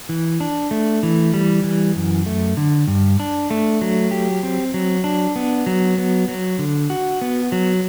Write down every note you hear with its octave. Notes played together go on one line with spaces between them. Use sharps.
E3
D4
A3
E3
G3
E3
F#2
A3
D3
G2
D4
A3
F#3
G4
C4
F#3
D4
B3
F#3
B3
F#3
D3
F#4
B3
F#3